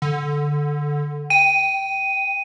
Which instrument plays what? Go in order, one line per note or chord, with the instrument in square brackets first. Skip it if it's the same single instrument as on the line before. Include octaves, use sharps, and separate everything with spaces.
[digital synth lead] D3
[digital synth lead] G5 [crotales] D#7